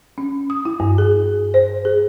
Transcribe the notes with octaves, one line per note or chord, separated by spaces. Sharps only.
C#4
D#6
E4
G2
G#4
C5
G#4